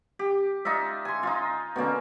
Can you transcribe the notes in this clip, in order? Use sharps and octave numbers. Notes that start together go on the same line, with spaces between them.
G4
D4 D#4 F4 E5
G#5 C6
D#4 F4
B2 D3 A#3 C#4